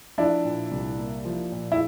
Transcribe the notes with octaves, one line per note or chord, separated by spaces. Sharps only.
F3 D4 E4
A#2
C2
A#3
F3
A#2
E4